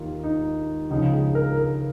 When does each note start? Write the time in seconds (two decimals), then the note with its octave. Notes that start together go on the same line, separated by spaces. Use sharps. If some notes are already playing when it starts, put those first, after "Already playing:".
Already playing: D#2 D#3 A#3 F4
0.23 D#4
0.90 C#2 C#3 F3 D#4
1.13 G#4
1.35 A#4
1.58 A#4